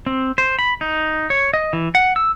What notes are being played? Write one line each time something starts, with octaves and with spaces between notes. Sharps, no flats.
C4
C5
B5
D#4
C#5
D#5
E3
F#5
E6